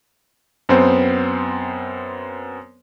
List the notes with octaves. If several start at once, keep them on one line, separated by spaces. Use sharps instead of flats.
F#2 B3 C4 C5